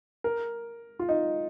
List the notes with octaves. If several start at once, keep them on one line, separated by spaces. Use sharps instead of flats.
A#4
F4
D#4